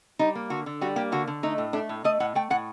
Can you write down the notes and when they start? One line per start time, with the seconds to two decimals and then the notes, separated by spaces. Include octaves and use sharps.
0.19 G3 D#4
0.35 A#3
0.50 D3 F#4
0.66 D3
0.81 G3 F#4
0.96 A#3 G4
1.12 D3 F#4
1.27 D3
1.43 A3 D#4
1.58 A2
1.73 A3 D4
1.89 A2
2.04 A3 D#5
2.20 A2 F#5
2.35 A3 G5
2.50 A2 F#5